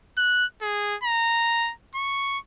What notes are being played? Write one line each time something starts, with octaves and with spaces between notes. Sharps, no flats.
F#6
G#4
A#5
C#6